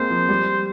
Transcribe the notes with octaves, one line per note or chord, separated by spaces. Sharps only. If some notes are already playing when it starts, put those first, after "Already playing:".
Already playing: G#3 A#3 C4 C5
F3
G3